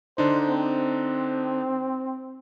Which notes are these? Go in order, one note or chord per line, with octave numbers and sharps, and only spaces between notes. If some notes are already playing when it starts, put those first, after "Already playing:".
D3 D4 D#4 C5
C4